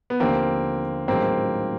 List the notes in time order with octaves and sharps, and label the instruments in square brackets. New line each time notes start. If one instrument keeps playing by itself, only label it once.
[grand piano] B3
[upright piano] D#2 D3 F3 [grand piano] A#3 C4
[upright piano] A1 G#2 D#3 F#3 [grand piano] A#3 C4